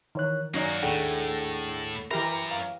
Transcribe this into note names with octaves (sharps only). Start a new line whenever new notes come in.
D#3 E3 C#5 F#6
F#3 A#3 C#4 D#4 F#4 D5 C#6 A#6
D#2 A2 D4 G#4 A4 F#5 G5
F#2 E3 G4 A#4 E5 A#5 B5
F5